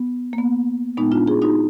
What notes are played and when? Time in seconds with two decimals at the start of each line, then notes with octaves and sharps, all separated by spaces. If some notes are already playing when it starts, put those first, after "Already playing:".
Already playing: B3
0.33 A#3
0.38 B3
0.97 A#2 G#3 B3 D#4
1.12 D4 F4
1.28 F4 G#4
1.42 D#4 F#4